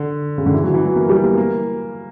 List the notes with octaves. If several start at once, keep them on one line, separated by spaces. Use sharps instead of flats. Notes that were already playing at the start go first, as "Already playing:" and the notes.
Already playing: D3
C#3
D3
E3
F#3
E3
F#3
A#3
G3
A#3
A#3